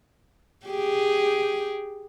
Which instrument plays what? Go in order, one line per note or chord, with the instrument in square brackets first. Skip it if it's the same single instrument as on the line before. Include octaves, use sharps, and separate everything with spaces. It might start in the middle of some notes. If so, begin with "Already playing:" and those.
[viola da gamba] G4 G#4